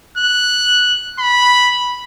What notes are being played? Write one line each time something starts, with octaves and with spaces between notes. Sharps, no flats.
F#6
B5